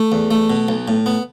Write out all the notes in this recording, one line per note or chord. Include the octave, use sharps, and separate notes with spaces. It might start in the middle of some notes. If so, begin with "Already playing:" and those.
Already playing: A3
E2
A3
B2
B1
A2
B3